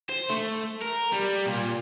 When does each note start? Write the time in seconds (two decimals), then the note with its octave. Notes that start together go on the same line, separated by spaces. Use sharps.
0.09 C5
0.29 A3
0.81 A#4
1.12 G3
1.46 A#2